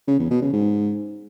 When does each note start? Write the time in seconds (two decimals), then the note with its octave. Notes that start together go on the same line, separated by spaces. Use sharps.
0.08 C#3
0.19 E2
0.30 B2
0.41 C#3
0.53 G#2